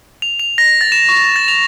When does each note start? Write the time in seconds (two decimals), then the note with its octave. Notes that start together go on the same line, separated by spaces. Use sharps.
0.22 F7
0.40 F7
0.58 A#6
0.81 A6
0.92 E7
1.09 C#6
1.36 A6
1.48 F7